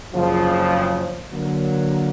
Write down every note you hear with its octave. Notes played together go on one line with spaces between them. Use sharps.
F#1 F2 C#3 F3
D3 F#3 A#3